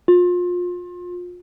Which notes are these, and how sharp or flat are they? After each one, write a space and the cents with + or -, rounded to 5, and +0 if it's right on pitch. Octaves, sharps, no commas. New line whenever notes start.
F4 +30